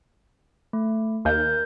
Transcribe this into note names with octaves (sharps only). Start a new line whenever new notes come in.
A3
D#2 A#4 G6